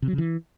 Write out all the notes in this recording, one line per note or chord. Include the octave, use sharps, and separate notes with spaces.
C3
F#3
C#3
E3